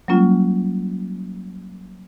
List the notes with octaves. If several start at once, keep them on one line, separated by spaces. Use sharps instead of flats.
F#3 G3 A#3 C#4 F4